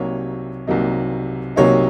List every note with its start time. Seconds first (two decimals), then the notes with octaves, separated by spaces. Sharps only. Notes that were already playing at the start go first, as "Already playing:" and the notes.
Already playing: C2 C3 F#3 A#3 D#4 C#5
0.67 C2 C3 F#3 A#3 D#4
1.56 C2 C3 F#3 A#3 D#4 C#5